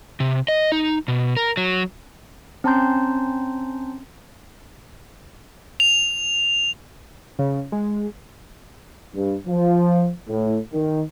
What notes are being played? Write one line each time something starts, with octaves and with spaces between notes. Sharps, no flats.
C3
D#5
D#4
B2
A#4
F#3
C4 C#4 A5 A#5 C6 G6
F7
C#3
G#3
G2
F3
A2
D#3